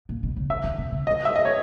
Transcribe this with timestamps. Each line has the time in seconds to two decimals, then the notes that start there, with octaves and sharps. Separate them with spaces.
0.09 A#2
0.23 B2
0.36 C#3
0.50 D#3 E5
0.64 D#3
0.78 B2
0.92 C#3
1.07 D#3 D#5
1.25 E5
1.36 D#5
1.45 C#5